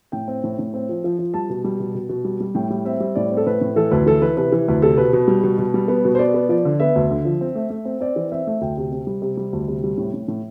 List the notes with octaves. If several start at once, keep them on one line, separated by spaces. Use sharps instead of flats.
A2 G5
C4
A2
A2
C4
F3
F3
F3
G3 A5
B2
G3
B2
B2
B2
G3
G3
A2 G5
G3
C4 E5
G3
A2 D5
C4
A4
A2 B4
A2
E3 A4
D2 B4
E3 A4
E3 B4
C3 B4
E3
D2 B4
C3 A4
B2 B4
B2
G3
B2
B2
G3
B3
B2
C5
B3 D5
B3
F3 D5
D3
B3 E5
D2
D3
F3
C4
A3
A3
C4
C4 D5
E3
C4 E5
A3
D2 G5
C3
C3
G3
C3
G3
D2
C3
G3
A2
A2
A2